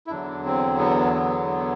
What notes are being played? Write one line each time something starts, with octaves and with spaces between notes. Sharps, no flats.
E4
E2 D3 F#3 D4
C4
B3
B3
B3